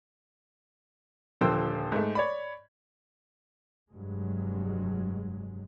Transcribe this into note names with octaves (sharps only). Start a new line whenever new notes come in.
D#1 D3 F3 C5 G5 E6
G#2 A3
C#5 D5 B5
F1 G2 F#3 G#3